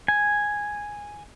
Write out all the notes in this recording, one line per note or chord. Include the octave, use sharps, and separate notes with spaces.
G#5